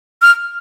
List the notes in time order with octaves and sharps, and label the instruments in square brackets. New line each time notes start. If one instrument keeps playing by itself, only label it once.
[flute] F6